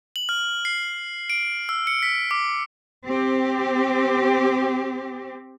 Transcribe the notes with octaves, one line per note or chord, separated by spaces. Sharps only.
F#7
F6
C7
D7
E6
C#7
B6
D6
C4 G4